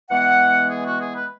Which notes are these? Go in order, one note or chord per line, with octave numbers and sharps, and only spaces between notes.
E3 G#3 B3 F#5
G#4
F#4
G#4
B4